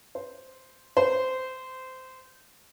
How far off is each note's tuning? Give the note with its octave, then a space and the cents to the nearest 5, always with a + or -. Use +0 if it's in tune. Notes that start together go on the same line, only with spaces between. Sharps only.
C5 -5
C5 -20